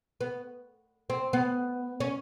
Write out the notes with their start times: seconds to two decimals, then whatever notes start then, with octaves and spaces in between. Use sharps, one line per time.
0.21 B3
1.10 C4
1.33 B3
2.00 C#4